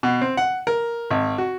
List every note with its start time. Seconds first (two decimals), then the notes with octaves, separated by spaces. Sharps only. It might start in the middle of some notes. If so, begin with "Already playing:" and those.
0.03 B2
0.22 C4
0.37 F#5
0.67 A#4
1.10 G#1
1.38 F#4